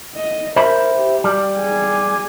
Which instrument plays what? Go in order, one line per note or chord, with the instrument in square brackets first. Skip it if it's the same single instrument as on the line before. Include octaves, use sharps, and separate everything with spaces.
[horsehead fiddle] D#5
[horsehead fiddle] A#4 [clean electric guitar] C5 E5 B5
[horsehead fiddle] G4
[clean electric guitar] G3
[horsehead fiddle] G#4 G#5